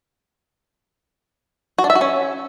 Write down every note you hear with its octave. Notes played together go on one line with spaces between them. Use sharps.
F#4
D4
E5
F#4
C#4